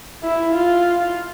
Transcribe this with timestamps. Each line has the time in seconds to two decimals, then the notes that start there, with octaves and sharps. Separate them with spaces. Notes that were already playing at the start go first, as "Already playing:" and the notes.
0.23 E4
0.52 F4